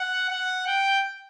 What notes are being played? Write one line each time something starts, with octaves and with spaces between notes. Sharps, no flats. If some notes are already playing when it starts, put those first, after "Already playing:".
Already playing: F#5
F#5
G5